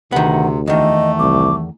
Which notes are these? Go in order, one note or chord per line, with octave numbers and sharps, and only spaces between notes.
D2 C3 D#3 B3 F#5
E2 D#3 A3 D#5
C2 D6